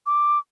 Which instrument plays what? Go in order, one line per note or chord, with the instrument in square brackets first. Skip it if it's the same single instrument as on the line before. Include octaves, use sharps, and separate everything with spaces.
[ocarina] D6